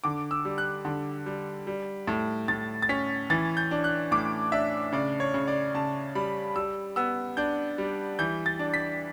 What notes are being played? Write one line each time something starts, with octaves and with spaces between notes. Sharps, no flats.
D3 D6
E6
G3
F#6
D3
G3
G3
A2
A2 A6
A6
C#4 B6
E3 A6
G6
D4
F#6
A2 D6
D4 E5
C#3 D5
C#5
C#3
D5
C#3 A5
G3 B5
G3 E6
B3 E6
D4 G6
G3
E3 G6
A6
D4
B6